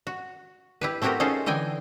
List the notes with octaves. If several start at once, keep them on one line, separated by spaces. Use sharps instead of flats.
F#4
E4 G4 B4
A3 C4 E4 F#4 G4 A#4
C#4 D#4 F4 G#4 A4 C5
D3 E3 D#5 G5 G#5